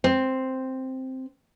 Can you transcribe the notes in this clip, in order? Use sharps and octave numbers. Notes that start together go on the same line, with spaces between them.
C4